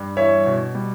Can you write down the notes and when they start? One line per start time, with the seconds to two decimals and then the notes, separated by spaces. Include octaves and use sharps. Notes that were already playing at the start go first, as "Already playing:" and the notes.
Already playing: G2 G3
0.17 E2 C#5 E5
0.46 B2
0.75 G3